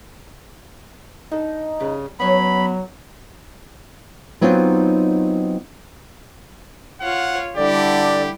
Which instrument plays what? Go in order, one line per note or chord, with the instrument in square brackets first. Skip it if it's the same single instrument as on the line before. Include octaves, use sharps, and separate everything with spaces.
[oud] D4 A4 [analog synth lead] D#4
[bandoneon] C#3 [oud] G3 B4
[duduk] F#3 [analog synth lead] B3 [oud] C#4 D4 C#5 [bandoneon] B5
[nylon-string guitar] F#3 B3 C4 D#4 F4
[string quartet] F4 C#5 F5 [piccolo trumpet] F#5
[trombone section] D3 [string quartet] G3 E4 [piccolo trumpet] G4 [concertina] D5